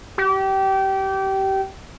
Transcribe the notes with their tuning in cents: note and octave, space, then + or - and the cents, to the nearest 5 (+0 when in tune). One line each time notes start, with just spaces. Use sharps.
G4 -25